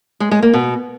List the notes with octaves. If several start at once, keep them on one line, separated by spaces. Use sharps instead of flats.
G#3
G#3
A#3
B2